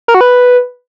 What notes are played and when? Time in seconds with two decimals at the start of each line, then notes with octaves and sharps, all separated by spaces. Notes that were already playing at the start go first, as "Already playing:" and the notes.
0.08 A#4
0.14 F#4
0.21 B4